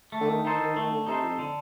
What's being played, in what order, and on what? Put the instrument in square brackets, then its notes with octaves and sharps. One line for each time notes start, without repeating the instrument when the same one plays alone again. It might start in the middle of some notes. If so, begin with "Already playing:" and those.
[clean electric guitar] A3
[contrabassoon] D3
D#3
[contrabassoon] D#3 [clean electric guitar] D#4 A4 C5
[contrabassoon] D#3
[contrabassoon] D#3 [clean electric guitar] A3
[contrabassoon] D3
[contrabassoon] C3 [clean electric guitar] D#4 A4 C5
[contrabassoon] F2
[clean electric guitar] D3